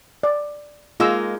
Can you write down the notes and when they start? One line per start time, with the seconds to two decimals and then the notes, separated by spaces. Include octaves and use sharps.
0.23 D5
1.00 G#3 A#3 D#4 F4 E6